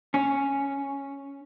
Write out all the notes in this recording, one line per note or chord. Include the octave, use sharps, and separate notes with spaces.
C#4